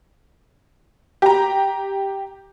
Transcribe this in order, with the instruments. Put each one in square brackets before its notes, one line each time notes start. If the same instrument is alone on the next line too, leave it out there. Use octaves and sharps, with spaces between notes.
[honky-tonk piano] G4 A#5